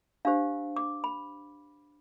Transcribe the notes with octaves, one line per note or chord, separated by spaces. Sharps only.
D4 G4 C5 F5
D6
B5